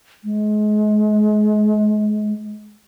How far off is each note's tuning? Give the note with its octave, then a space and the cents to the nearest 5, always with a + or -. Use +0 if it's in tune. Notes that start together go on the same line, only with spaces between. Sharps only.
G#3 +30